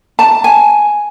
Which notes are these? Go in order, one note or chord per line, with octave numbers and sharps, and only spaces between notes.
A5
G#5